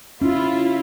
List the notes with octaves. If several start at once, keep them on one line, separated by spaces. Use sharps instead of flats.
C#4 E4 F4